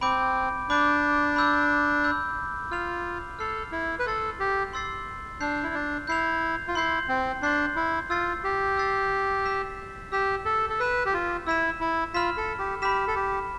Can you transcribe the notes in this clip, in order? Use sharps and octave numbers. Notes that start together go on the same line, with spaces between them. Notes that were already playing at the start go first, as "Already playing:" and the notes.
C4 B5 D6 G6 D7
D4 B5 D6 G6 D7
B5 E6 G6
B5 E6 G6
F4 F6 C7 F7
A4 F6 C7 F7
E4
B4
A4 C6 E6 A6 C7
G4
C6 E6 A6 C7
D4 G6 C7 F7
E4
D4
E4 G6 C7 F7
F4
E4 C6 G6 C7
C4
D4 C6 G6 C7
E4
F4 E6 A6 C7
G4
E6 A6 C7
E6 B6 E7
G4 E6 B6 E7
A4
A4
B4 E6 B6 E7
G4
F4
E4 E6 B6 E7
E4
F4 B5 F6 B6 E7
A4
G4
G4 B5 F6 B6 E7
A4
G4